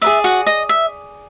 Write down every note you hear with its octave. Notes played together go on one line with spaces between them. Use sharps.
G#4 B4 D5 E5
F#4 F#5
D#5
E5